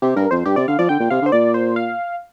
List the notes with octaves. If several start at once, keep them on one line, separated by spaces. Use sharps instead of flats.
C3 G4
G2 A#4
F2 C5
G2 G4
C3 D5
D3 F5
F3 D5
D3 G5
A#2
C3 F5
D3
C5
A#2 D5
C5
F5